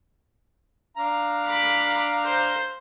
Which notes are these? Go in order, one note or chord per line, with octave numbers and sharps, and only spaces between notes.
D4 F5 A#5
B5 D6
C5